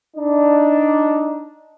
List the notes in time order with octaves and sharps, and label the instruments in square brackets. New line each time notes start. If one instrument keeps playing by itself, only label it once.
[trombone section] D4 D#4